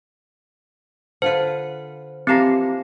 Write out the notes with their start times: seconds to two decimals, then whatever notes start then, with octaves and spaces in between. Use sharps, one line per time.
1.22 D3 F4 B4 C5
2.27 E3 F3 A#3 C4 G4 A#6